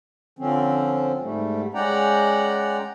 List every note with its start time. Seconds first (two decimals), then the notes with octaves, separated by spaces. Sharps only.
0.39 D3 F3 C4 C#4
1.21 G#2 G3 A3
1.74 G#3 C#4 D5 F#5 G5 A#5